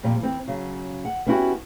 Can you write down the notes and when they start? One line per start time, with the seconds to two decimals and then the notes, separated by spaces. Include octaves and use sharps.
0.03 F2 A#2 G3
0.20 E3 C4
0.48 C#3 F#3
1.05 F#5
1.27 B3 C#4 D#4 E4 F#4 G4